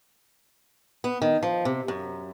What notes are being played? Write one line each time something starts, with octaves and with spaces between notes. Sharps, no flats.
B3
D#3
F3
C3
F#2